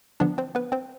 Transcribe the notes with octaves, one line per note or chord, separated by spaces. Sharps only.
D3 F3 B3 D4 D5
C4 C5
B3 B4
C4 C5